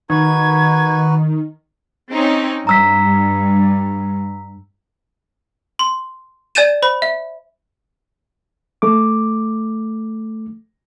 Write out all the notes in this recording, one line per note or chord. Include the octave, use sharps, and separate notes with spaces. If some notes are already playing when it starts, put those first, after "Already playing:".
D#3 D#4 F#4 B4 G#6
C4 C#4 D#4
G2 A#5 E6 B6
C6
D5 G#5 G6 A6 D#7 E7
C5 B5
E5
A3 D6